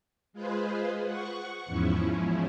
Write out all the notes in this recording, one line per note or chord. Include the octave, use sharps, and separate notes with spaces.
G#3 F4 G#4 B4 C5
F#5 C#6
E2 G#2 F3 C#4 E4